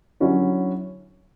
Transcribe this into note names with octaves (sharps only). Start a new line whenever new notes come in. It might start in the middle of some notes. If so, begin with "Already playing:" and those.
D3 F#3 C#4 E4